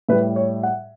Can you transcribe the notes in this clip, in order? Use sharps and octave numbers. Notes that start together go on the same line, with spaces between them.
A2 G3 B4
C#5
F#5